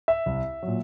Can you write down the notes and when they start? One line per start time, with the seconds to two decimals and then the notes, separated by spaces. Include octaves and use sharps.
0.08 E5
0.26 C2
0.63 A#2 F#3